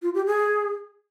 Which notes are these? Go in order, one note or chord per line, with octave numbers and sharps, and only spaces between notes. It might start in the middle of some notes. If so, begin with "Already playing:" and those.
F4
G4
G#4